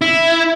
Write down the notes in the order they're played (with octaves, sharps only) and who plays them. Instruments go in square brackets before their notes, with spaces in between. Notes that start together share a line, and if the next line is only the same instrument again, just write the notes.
[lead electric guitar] E4